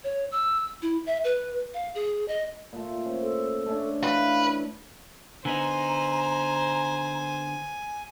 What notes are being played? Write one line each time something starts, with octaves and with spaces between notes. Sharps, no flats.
C#5
E6
E4
E5
B4
F5
G#4
D#5
A#2 A3
C#4 C5
A4
A3 C#4 D4
E3 A3 B4 F5
D3 B3 D#4 C5 G#5 A#5